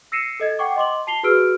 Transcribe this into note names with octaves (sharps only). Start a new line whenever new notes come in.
E6 A#6 C7 C#7 D#7 E7
A4 D#5 G#6
F#5 G5 C#6 D6
D#5 C6 D6 F#7
A5 C7 F7 G7
F#4 G#4 B4 E6 F6 D7